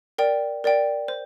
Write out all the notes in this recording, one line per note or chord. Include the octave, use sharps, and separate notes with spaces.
A#4 D5 G5
A#4 D5 G5
C5